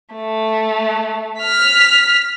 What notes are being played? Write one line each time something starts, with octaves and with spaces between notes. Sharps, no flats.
A3
F6 B6